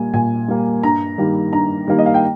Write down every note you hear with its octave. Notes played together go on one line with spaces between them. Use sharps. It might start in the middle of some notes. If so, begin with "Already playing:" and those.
Already playing: A#2 G3 A#3 G#5
A#2 G#5
G3 A#3
G2 A#5
D#3 G3 A#3
G2 A#5
D#3 G3 A#3
D#5
F5
G5